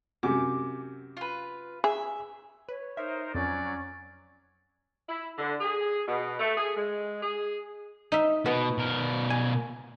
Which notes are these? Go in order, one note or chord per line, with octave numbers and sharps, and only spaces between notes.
F#2 C3 D6
F4 B4
G#4 E5
B4 C#5
D#4 A#4 C5 E5
F2 F#3 C#4 D5
E4
D3
G#4
B2
A3
G#4
G#3
G#4
D#4 E5
B2 B3
B2 A#4
G#5